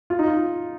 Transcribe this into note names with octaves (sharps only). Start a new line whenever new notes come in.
F4
D#4
F4